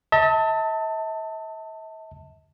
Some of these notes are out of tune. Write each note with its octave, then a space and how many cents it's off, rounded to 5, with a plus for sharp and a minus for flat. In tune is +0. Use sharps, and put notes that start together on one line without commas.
E5 -45 A5 +20